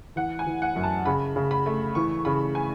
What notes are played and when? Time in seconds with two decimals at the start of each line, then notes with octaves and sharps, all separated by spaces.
0.16 E3 F#5
0.39 G#5
0.47 E3
0.62 F#5
0.76 F#2
0.83 A5
1.06 C#3 B5
1.36 C#3
1.51 B5
1.66 A3
1.95 E3 C#6
2.25 C#3 B5
2.55 G#5